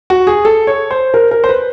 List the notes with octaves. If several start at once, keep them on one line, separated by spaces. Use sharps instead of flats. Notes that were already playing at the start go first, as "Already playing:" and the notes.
F#4
G#4
A4
C#5
C5
A#4
A#4
C5
B4